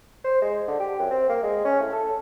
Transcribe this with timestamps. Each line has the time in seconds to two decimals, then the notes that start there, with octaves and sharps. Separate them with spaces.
0.24 C5
0.42 G#3
0.68 D3
0.80 G4
0.99 F#2
1.10 C4
1.29 A#3
1.43 G#3
1.65 C#4
1.80 A2
1.92 A4